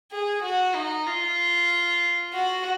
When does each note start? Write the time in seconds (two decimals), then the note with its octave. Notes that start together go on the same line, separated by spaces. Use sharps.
0.12 G#4
0.43 F#4
0.75 D#4
1.07 F4
2.34 F#4